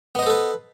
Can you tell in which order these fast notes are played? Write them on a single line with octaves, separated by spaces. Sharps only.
B3 D#5 C5 A4 B4